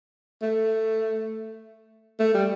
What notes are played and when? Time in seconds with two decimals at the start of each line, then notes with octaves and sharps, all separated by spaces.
0.42 A3
2.19 A3
2.34 G3